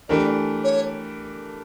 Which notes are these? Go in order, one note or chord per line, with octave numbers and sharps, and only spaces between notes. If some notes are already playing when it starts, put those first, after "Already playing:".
E3 A3 D4 G4 A#4 D5
C#5